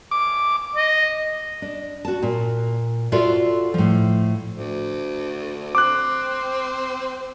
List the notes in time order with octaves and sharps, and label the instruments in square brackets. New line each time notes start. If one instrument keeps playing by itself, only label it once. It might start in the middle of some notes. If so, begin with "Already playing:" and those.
[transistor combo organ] D6
[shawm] D#5
[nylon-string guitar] D4
F#4 A5
A#2
F4 F#4 A4 C5 D5 E5
A2 F3
[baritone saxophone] D2
[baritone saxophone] C4 [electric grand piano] D6 F#6